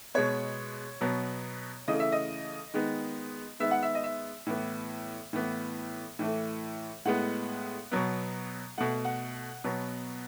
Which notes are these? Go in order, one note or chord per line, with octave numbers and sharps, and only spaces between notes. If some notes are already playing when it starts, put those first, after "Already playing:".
B2 G#3 B3 C#5
B2 F#3 B3
C#3 E3 A3 D#5
E5
D#5
D#3 G#3 B3
D#3 G#3 B3 E5
F#5
E5
D#5
E5
A2 E3 B3
A2 E3 B3
A2 E3 A3
A2 G#3 B3 F#5
B2 F#3 B3
B2 A3 F#5
F#5
B2 F#3 B3